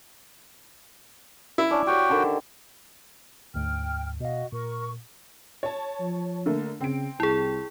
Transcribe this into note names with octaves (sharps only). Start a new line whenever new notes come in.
E4
C#4 D4 D5
F#4 G4 C#5 G5
D3 D#3 A5
D2 G#2 G5 F6
B2 F#4 D#5 F5
A#2 A#4 C#6
C#5 A5
F3
D3 A3 A#3
C#3 C4 D7
C2 E4 G#4